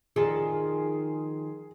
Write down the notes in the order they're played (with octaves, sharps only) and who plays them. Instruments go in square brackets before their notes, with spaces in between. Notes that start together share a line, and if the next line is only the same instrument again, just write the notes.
[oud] D#3 F3 A4 [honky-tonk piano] G#4